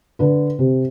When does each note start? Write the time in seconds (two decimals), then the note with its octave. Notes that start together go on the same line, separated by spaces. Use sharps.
0.19 D3 B4
0.59 C3